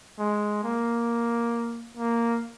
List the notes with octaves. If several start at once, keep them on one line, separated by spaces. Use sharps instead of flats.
G#3
A#3
A#3